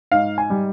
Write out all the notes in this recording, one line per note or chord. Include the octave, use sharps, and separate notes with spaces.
G#2 F5
G#5
G3